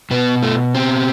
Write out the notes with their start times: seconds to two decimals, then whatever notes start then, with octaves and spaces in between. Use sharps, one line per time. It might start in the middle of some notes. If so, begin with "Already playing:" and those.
0.11 B2 B3
0.43 A3
0.75 C4